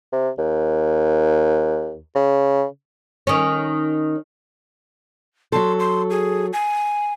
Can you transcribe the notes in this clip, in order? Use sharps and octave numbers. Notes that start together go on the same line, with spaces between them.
C3
D#2
C#3
D#3 C#4
F#3 A4 C6
C6
G#4
G#5